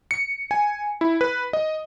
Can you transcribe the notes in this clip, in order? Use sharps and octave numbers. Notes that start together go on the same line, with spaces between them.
C#7
G#5
E4
B4
D#5